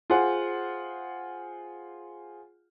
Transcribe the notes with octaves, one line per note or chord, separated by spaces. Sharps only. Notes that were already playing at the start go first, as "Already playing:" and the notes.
F4 G#4 C5 F#5 G#5